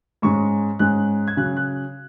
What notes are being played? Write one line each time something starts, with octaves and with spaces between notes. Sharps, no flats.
G#2 G#3 C#4 C#6
G#2 G#3 C#4 F#6
G#6
C#3 F#3 C#4 F#6
F#6